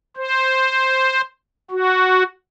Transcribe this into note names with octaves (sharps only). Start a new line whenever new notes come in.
C5
F#4